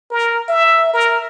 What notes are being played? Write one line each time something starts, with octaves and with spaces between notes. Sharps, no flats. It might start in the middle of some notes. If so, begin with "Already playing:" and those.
A#4
E5
A#4